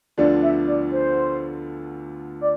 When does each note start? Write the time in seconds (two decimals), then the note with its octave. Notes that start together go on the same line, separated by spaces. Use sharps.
0.17 D2 D3 F3 B3 D4 D5
0.43 E5
0.67 D5
0.92 C5
2.41 D5